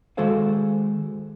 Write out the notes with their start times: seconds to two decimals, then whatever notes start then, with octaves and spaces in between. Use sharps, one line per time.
0.17 D#3 G#3 F#4 A4 C5 F5